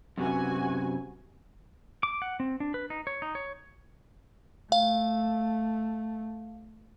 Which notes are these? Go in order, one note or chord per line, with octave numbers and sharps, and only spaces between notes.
F#2 C3 B3 F#4 G#5
D6
F#5
C4
D4
B4
D#4
C#5
D#4
C#5
A3 F5